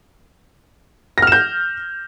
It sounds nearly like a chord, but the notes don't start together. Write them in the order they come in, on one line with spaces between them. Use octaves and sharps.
A#6 F6 E7 G6